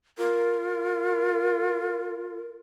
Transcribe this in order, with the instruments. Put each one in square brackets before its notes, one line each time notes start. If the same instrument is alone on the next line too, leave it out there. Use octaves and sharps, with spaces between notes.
[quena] F4 [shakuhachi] A#4